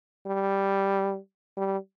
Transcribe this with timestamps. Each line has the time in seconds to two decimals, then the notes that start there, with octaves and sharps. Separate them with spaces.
0.26 G3
1.57 G3